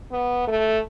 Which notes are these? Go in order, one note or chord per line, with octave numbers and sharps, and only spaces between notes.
B3
A3